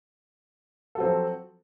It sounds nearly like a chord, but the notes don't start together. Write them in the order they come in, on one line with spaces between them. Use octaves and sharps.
A4 F#3 C4 F3